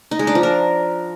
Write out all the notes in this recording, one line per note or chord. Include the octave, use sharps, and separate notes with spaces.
D#4
G#3
D4
F3
A#4